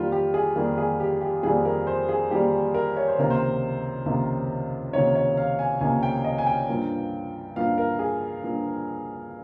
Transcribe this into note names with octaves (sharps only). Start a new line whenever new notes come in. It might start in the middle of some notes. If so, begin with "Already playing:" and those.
Already playing: F2 D#3 G3 A#3 F4 G4
G4
G#4
F2 D#3 G3 A#3 A#4
G#4
G4
G4
F2 D#3 G3 A#3 G#4
A#4
C5
G#4
F2 D#3 G3 A#3 G4
A#4
C#5
C5
C#2 C3 D#3 A#3 A#4
C5
C#2 C3 D#3 A#3
C#2 C3 D#3 A#3 C#5
C#5
F5
G#5
C#2 C3 D#3 A#3 G#5
G5
D#5
G#5
G5
G2 F3 A#3
G2 F3 A#3 F5
A#4
G#4
G2 F3 A#3